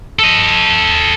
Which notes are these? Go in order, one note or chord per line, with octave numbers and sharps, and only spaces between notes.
A4 D#5